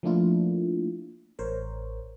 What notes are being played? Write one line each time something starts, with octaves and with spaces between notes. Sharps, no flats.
F3 A3 A#3 D4 E4 F4
A1 A#4 C5 C#5